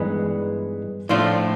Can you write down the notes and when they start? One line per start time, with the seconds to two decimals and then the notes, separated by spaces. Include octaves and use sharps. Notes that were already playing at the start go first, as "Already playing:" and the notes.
Already playing: G2 E3 G#3 B3 D#4
1.09 A2 F3 A3 D4 F4